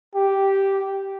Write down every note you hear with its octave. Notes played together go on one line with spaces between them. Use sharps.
G4